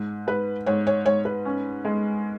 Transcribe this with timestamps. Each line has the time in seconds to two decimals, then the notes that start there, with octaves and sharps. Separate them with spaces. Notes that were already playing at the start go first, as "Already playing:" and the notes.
Already playing: G#2
0.27 G#2 B4
0.66 G#2 C#5
0.87 C#5
1.05 G#2 C#5
1.25 B4
1.45 C#4
1.85 G#3